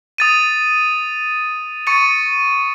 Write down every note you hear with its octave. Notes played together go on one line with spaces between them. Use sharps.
D#6 A6 D#7
C#6 A6 C#7 D#7